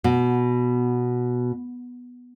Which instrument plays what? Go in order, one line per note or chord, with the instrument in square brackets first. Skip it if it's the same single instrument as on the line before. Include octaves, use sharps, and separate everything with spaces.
[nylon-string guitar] B2